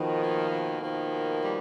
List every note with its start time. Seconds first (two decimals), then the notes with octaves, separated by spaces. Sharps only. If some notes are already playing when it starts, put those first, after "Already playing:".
Already playing: B2 D#3 F3
0.20 A#3
0.51 B2
0.81 D#3 F3 A#3
1.12 B2
1.42 G3